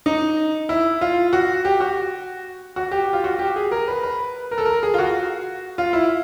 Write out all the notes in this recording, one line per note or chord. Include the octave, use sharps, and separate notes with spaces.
D#4
E4
F4
F#4
G4
F#4
F#4
G4
F4
F#4
G4
G#4
A#4
B4
B4
A#4
A4
A#4
G#4
F4
F#4
F4
E4